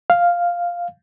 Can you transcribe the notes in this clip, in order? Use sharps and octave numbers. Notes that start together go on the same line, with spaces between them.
F5